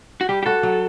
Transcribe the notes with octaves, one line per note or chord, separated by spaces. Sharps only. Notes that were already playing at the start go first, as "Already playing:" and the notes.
F#4
G3 G4
G4
F#4 A4
F#3